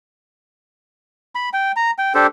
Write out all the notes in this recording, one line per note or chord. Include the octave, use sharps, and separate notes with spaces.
B5
G5
A#5
G5
D4 G4 A4 C5